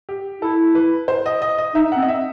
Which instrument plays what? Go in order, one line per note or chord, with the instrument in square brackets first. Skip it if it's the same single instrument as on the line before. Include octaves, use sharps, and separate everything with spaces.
[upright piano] G4
[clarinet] E4 [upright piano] A4
[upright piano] B4
C5
D#5
D#5
D#5
[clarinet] D#4 [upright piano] E5
[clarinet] C4 [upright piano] F#5
[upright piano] D#5
E5